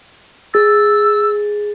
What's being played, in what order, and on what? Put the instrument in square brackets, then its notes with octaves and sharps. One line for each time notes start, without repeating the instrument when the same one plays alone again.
[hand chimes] G#4 A6 [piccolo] E6